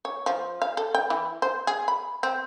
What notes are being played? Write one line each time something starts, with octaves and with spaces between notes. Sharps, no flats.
C#5
F3
F5
A4
G5
E3
C5
G#4
B5
C4